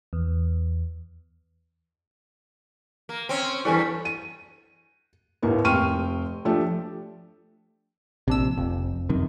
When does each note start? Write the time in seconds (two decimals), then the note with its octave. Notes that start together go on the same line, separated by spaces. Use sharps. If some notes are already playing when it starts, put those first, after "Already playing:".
0.13 E2
3.09 A#3
3.29 C4 C#4
3.65 E2 G2 G3 E4 A4 G#5
4.05 D#7
5.42 D#2 A2 A#3 B3
5.64 F1 G5 C6 C#6 F6 D#7
6.45 F3 A3 D4 G4
8.28 A#1 C3 D4 E6
8.57 F1 F2
9.09 F#2 C3 D#3